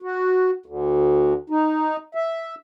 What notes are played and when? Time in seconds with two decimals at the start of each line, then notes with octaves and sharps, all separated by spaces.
0.02 F#4
0.66 D2
1.50 D#4
2.15 E5